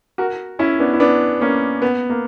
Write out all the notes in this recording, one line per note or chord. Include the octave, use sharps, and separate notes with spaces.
F#4 A#4
C#4 E4
B3 D4
E4
B3 D4
A#3 C#4
B3
A#3